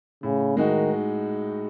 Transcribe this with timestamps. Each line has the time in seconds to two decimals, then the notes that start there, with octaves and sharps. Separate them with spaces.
0.23 A2 C#3
0.57 D#3 G#3 D#4 F#4